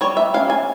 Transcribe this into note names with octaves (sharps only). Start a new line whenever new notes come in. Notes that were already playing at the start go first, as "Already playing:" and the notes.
G3 C#5
E5
C#4 F5
G#5